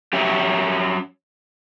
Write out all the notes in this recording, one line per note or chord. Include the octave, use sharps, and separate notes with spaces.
F#3 C#4 G4 C#5 E5